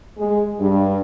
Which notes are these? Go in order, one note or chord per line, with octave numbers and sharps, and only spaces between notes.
G#3
G2